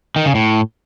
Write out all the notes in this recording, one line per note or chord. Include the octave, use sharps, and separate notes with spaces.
D#3
C#3
A2